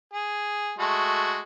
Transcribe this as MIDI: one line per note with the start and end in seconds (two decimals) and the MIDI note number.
0.13 0.74 68
0.79 1.41 56
0.79 1.41 57
0.79 1.41 66